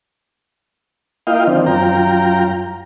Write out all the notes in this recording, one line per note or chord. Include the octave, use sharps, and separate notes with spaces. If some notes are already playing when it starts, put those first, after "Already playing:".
A#3 E4 F4 D#5 F5 G5
D#3 F3 C4 D4
F#2 F4 G5 A#5